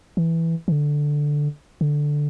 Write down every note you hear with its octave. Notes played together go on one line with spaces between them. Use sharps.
E3
E3
D3
D3